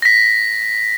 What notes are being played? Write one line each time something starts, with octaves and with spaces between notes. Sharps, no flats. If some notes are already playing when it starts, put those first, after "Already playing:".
A#6 B6